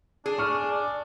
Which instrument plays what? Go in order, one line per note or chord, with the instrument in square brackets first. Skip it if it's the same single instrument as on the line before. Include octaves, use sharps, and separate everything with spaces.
[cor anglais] D4 [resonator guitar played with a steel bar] G#4
[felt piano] C#6 F6
[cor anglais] D5